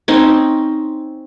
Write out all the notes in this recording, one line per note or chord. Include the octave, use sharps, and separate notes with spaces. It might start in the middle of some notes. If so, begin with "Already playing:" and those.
C4 C#4 D#4